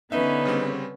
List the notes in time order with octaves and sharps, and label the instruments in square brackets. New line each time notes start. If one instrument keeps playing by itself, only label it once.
[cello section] D3 B3 C#4 [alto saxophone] D#4 [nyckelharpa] B4 [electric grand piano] E5
[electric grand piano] C#3 G3 C4